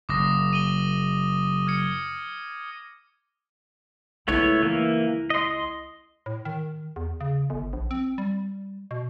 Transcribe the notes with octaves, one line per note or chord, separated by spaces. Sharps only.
F#1 D6 D#6 A#6
D#7 F#7 G7
F6 G#6 C#7
C#2 A3 B3 E4 C#5
E3 A#3
D#5 C6
A2
D#3
E2
C#3
G1
A#1
C4
G3
B2